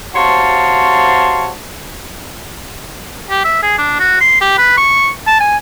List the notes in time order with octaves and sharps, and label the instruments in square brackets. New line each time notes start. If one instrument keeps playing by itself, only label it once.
[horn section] C3 F#4 C5 C#5 F5 A5
[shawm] G4
E5
G#4
D4
F#4
C6
G4
B4
C#6
A5
G#5